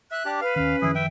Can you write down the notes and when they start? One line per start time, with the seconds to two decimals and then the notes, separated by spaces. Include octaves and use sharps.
0.11 E5 F#6
0.25 D4 G4
0.41 B4 F5
0.56 D#2 D#3 C#4 F5
0.82 F#2 D#3 F3 E4 G#4
0.95 E5 G5